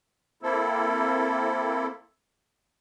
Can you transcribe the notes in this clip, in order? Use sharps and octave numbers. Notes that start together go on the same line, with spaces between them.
A#3 C4 E4 A4